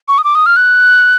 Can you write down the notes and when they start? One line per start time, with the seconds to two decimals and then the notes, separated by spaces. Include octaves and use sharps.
0.08 C#6
0.18 D#6
0.24 D6
0.35 D#6
0.46 F6
0.56 F#6